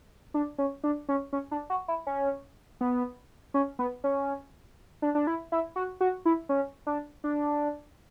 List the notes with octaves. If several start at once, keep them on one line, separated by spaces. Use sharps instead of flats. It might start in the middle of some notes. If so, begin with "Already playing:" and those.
D4
C#4
D4
C#4
C#4
D4
F#4
E4
C#4
B3
C#4
B3
C#4
D4
D4
E4
E4
F#4
F#4
E4
C#4
D4
D4